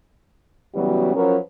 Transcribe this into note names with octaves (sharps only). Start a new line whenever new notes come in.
C#3 E3 F#3 G3 B3 F#4
F3 F#3 C#4 A#4 B4 C#5